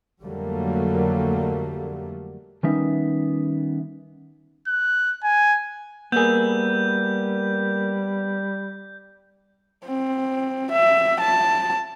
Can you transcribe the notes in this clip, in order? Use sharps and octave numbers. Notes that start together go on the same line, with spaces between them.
F2 D3 F#3 G3 A3 A#3
D#3 G3 B3 C#4 D#4 E5
F#6
G#5
G3 A#3 B3 G#4 A#4 G6
C4
E5
A5